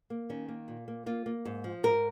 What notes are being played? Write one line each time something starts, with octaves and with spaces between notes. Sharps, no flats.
A#3
D#3 C#4
A#3
A#2
A#3
A#3 F4
A#3
G#2
F3
G#2 A#4